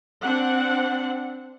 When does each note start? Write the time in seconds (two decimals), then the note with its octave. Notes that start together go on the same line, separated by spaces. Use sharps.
0.22 C4 D4 F#5